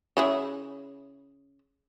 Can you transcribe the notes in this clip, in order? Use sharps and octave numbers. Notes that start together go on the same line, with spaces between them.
C#3 E4 G#4